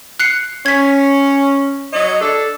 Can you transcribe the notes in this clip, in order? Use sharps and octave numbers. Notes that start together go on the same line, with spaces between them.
F#6 C7 C#7
C#4 G#6 B6
F#3 C#5 D#5
D4 A4